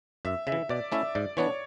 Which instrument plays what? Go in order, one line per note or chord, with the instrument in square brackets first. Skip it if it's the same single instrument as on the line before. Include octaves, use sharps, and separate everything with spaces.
[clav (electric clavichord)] F#2 [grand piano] E5
[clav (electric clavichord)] C#3 [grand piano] E5
[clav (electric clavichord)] E3
[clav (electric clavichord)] B2 [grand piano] D5
[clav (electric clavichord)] A3 C#4 E4 [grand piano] E5
[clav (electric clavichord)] G#2 [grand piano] D5
[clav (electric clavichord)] E3 B3 D4 [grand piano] C#5